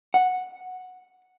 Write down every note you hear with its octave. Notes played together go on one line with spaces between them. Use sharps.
F#5